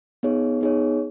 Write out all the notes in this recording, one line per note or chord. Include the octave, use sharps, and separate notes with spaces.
B3 D#4 G#4 C#5
B3 D#4 G#4 C#5